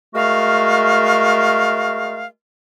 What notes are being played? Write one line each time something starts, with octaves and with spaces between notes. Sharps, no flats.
G#3 A3 F#4 A#4 F5